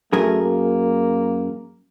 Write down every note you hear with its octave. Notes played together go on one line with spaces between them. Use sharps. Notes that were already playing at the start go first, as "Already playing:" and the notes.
F#2 A3 G#4 A#4
A#3